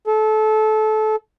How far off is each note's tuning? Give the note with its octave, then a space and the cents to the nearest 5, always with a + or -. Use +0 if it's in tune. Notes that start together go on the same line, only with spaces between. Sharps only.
A4 -25